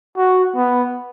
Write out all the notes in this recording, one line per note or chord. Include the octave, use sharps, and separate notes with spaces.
F#4
B3